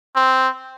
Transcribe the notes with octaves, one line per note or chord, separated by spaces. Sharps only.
C4